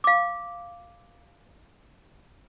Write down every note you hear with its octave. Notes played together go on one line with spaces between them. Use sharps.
F5 D6